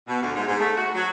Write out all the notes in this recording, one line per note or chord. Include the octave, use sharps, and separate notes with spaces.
B2
D2
G#2
G#2
A3
F#4
F#3